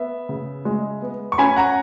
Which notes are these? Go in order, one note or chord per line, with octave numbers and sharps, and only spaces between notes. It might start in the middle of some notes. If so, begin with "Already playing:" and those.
Already playing: B3 E5
C#3
G#3
B3
C#6
C#4 G#5 B5
F#5 A#5